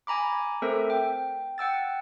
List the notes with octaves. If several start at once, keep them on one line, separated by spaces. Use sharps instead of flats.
G#5 A#5 B5 D6
A3 C4 A4 A#4 C5 E5
G5
F#5 G5 E6 A6